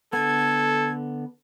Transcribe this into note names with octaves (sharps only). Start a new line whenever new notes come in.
D3 B3 A4 G#6